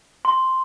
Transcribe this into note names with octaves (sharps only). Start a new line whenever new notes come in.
C6